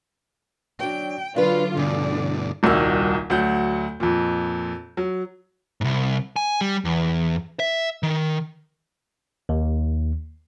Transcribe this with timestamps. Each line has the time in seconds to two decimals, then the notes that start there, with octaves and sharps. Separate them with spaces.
0.80 F#3 D4 G5
1.36 D3 F#3 D4 F4 B4
1.77 G2 B2 D3 E3 D5
2.63 D#1 C2 D#3 F#4 E6
3.30 D2 F#3 F#5 G6
4.00 F2 A#2
4.97 F#3
5.81 C2 G#2
6.36 G#5
6.61 G3
6.85 E2
7.60 E5
8.03 D#3
9.49 D#2